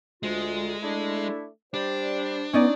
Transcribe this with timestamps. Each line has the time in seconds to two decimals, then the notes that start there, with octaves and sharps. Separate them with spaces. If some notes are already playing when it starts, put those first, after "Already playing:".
0.23 D2 G#3 F4
0.83 A3 D4 E4
1.74 G3 D4 C5
2.53 B3 C#4 D#4 D5